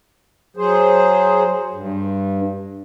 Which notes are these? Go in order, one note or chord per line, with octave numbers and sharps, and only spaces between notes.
F#3 G#4 C5
G2